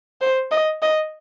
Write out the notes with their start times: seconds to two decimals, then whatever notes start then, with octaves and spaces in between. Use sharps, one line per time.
0.21 C5
0.51 D#5
0.82 D#5